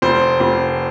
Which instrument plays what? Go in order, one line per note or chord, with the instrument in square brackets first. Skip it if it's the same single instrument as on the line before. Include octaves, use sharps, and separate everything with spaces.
[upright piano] F1 C5
F1